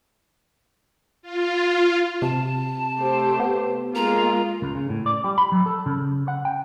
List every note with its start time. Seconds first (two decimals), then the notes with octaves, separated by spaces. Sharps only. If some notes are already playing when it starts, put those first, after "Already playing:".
1.22 F4
2.22 C3 A5
2.97 A3 G4 C5
3.40 B3
3.95 G#3 A#3 F4 A#5
4.62 C#2
4.75 C#3
4.89 A2
5.06 D5
5.24 G3
5.38 B5
5.52 F#3
5.66 A4
5.86 C#3
6.28 F#5
6.45 G5